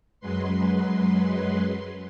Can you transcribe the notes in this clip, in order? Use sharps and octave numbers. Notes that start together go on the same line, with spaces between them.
F#2 F#3 G#3 B4 C6